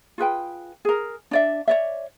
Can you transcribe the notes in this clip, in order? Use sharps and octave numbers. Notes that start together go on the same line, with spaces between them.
F4 G#4 B4 G5
G#4 A#4
D4 D5 E5
C#5 D5 E5